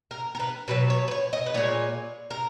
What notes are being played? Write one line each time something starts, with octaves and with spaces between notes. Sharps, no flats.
A#4
A#4
B4
B2 F#3 B4
C#5
B4
C#5
D#5
B4
A#2 G#3 C#5
A#4